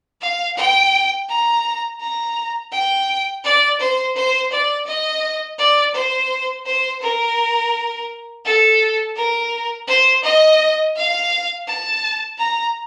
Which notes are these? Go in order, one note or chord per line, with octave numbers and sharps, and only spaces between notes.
F5
G5
A#5
A#5
G5
D5
C5
C5
D5
D#5
D5
C5
C5
A#4
A4
A#4
C5
D#5
F5
A5
A#5